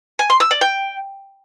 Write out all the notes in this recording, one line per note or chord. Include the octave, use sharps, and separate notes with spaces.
G#5
C6
E6
D5
G5